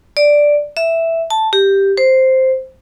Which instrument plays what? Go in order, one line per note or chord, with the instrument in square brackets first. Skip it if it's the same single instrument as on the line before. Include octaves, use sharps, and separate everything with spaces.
[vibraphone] D5
E5
A5
G4
C5